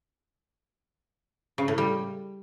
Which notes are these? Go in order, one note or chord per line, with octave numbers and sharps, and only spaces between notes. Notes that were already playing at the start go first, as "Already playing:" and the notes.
C#3
A2
G3